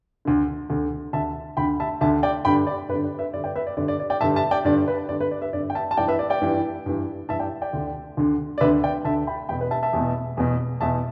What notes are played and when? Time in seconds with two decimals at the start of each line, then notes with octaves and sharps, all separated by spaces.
0.25 D2 D3
0.70 D2 D3
1.13 D2 D3 E5 A5
1.57 D2 D3 G5 B5
1.80 E5 A5
2.01 D2 D3 E5 A5
2.23 D5 G5
2.45 G2 D3 G5 B5
2.67 D5
2.89 G2 B4
2.93 D3
3.04 D5
3.19 B4 E5
3.33 G2 D3 D5
3.44 D5 G5
3.56 B4 E5
3.67 D5
3.77 G2 D3 D5
3.88 D5
4.00 D5
4.10 D5 G5
4.21 G2 D3 E5 A5
4.36 E5 A5
4.51 D5 G5
4.65 G2 D3 D5
4.88 B4
5.09 G2 D3 D5
5.20 B4
5.31 D5
5.42 B4 E5
5.53 G2 D3 D5
5.70 G5
5.75 E5 A5
5.91 A5
5.97 G2 E3 D5 G5
6.08 B4 E5
6.19 D5
6.30 D5 G5
6.42 G2 E3
6.86 G2 E3
7.29 G2 E3 E5 A5
7.40 D5 G5
7.62 D5 G5
7.73 D2 D3
8.17 D2 D3
8.58 D5
8.61 D2 D3 B4 E5
8.83 D5 G5
9.05 D2 D3 E5 A5
9.27 G5 B5
9.49 E2 B2 G5 B5
9.61 B4
9.71 E5 A5
9.83 E5 A5
9.93 E2 B2
10.37 E2 B2
10.81 E2 B2 E5 A5